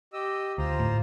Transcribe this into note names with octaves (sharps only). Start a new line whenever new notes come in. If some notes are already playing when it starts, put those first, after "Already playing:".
G4 D#5 E6
D2 F4 C5 A#5
A2